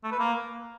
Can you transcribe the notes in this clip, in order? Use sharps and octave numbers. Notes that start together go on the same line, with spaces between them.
A3
B4
A#3